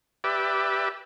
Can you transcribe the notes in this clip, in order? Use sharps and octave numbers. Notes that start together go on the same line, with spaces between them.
G4 B4 D5 E5